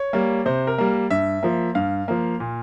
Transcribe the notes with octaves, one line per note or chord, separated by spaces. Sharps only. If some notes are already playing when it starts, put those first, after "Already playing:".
Already playing: C#5
G3 A#3
C3 C5
A#4
G3 A#3
G2 E5
F3 A#3
G2 F5
F3 A#3
A#2